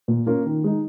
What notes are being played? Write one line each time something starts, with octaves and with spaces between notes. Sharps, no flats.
A#2
A#3 C#4 F4 A#4
D#3
G#3 D#4